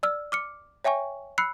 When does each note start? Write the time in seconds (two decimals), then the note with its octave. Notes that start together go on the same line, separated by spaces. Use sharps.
0.03 D5 E6 F6
0.32 D6 F6 C#7
0.84 C#5 E5 G5 G#5 C#6
1.38 B5 E6 F#6 C7 C#7